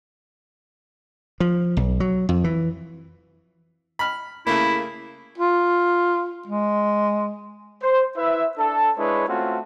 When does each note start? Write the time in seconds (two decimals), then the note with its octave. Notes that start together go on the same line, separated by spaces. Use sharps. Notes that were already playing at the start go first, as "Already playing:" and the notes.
1.40 F3
1.77 B1
2.00 F#3
2.29 F2
2.44 E3
3.99 B5 F6
4.47 C#3 A3 A#3 E4
5.38 F4
6.47 G#3
7.83 C5
8.17 E4 B4 E5
8.58 D4 A4
8.97 G#3 D4 E4 B4 C#5
9.28 A3 C4 C#4 F4 F#4